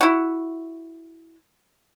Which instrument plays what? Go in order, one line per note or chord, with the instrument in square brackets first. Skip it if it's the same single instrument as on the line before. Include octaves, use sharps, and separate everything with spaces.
[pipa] E4 F#4